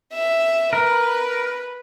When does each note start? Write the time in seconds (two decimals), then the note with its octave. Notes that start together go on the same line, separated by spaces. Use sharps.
0.13 E5
0.73 A#4 B4